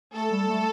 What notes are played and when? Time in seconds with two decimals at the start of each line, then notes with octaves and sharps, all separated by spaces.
0.14 A3 A4
0.31 G3
0.48 A3